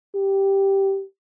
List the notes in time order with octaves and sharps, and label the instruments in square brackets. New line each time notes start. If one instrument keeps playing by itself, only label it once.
[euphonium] G4